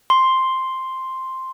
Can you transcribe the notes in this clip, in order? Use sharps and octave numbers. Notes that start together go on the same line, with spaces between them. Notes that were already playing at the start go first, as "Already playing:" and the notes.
C6